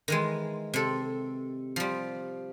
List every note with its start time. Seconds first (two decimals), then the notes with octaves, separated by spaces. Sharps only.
0.08 D#3 E3 G#3
0.74 C3 A4
1.76 F3 G3